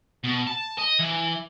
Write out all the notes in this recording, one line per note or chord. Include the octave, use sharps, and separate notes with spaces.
B2
A5
D#5
E3